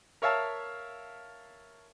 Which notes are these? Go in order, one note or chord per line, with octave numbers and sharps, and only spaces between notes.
A#4 C#5 E5 F5 A5